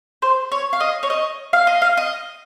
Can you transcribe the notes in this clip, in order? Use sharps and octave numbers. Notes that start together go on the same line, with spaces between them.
C5
C#5
F5
D#5
C#5
D#5
F5
D#5
F5
D#5